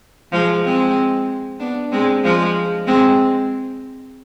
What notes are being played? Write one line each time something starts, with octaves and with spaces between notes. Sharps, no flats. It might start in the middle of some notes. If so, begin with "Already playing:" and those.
F3 G#3
G#3 C4
B3 D4
G#3 C4
F3 G#3
G#3 C4